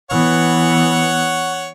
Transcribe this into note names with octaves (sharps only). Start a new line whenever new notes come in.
E3 B3 C#5 F#5